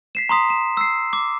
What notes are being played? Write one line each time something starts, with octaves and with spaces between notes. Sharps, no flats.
B6 C7 E7
A#5 C6 D#6 B6
E7
E6 C7
D6